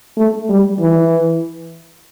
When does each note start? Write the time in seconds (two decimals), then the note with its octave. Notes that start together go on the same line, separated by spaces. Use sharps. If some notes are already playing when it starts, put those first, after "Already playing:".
0.17 A3
0.49 G3
0.80 E3